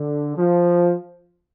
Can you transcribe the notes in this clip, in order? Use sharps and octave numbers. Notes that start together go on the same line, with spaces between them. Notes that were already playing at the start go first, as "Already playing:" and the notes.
Already playing: D3
F3